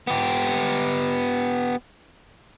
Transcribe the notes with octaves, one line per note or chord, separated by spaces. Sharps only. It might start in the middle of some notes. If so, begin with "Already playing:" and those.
B3 G4